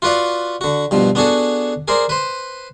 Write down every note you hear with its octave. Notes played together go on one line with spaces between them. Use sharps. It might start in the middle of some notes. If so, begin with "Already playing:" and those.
F4 F#4 B4 D5 F5
D3 F#4
G2 B2 F3
B3 D4 F#4 G#4 A4
G#4 A#4 C5 D5
B4 C5